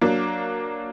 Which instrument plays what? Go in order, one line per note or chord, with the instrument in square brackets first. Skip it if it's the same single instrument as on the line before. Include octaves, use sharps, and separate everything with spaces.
[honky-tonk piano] F#3 A#3 D4